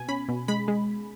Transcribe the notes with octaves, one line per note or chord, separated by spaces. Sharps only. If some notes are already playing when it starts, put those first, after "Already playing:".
Already playing: B2 G#5
C#4 B5
B2
G#3 B5
G#3